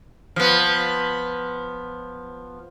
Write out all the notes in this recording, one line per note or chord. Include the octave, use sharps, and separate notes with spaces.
F3 B3